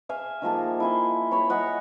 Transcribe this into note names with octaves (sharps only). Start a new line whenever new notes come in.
E5 F5 G#5
D#3 F3 A#3 A4
E4 G#5 C6
C#5 B5
D#5 F#5 G#5